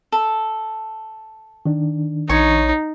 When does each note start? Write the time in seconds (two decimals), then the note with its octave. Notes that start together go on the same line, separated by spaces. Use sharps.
0.12 A4
1.66 D#3 D4
2.29 A#1 D#4 C#5 C#6